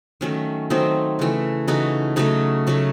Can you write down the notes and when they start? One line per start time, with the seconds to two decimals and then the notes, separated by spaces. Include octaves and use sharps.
0.21 D#3 F#3 A3 C#4
0.70 D#3 F#3 A3 C4 D#4
1.19 C#3 E3 A3
1.68 C#3 E3 A3 D#4 F#4
2.16 C#3 F#3 A3 D#4 F#4
2.67 C#3 F#3 A3